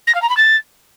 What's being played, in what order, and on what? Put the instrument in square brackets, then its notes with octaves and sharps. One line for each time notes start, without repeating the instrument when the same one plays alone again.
[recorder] A#6
F5
A#5
B5
A6